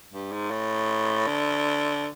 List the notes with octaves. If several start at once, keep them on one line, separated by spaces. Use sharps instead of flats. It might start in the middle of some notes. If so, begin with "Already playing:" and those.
G2
G#2
A2
D3